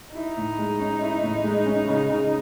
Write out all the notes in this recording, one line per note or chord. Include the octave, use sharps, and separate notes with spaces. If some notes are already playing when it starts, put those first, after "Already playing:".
D#4 E4
A2
G#3
C#4
E4
A2
G#3
C#4
C#3
C#3